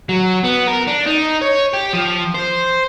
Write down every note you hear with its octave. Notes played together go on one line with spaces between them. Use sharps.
F#3
B3
A#4
D4
D#4
C#5
G4
F3
C5